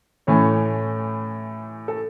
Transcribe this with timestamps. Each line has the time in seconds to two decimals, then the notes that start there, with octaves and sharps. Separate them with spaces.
0.27 A2 E3 A3 C#4 C#5
1.88 A4